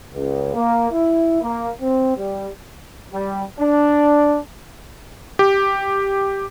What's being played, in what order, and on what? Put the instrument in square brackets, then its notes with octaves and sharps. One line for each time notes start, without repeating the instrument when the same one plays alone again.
[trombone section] C#2
A#3
E4
A#3
C4
G3
G3
D4
[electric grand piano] G4